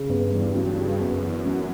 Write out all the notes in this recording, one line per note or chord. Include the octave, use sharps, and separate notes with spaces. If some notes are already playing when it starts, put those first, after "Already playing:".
Already playing: C#3
G2 B3
E2
F#3
C#3
F#2 B3
E2
F#3